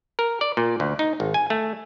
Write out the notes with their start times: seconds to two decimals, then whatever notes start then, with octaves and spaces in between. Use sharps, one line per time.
0.19 A#4
0.41 D5
0.57 A#2
0.80 D2
0.99 D#4
1.20 G#1
1.34 G#5
1.50 A3